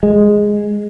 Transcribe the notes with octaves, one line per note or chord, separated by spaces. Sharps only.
G#3